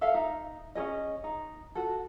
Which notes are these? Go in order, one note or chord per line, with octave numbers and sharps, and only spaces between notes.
A4 E5 F5
D#4
C#4 D#4 G#4 D#5
D#4
F#4 A4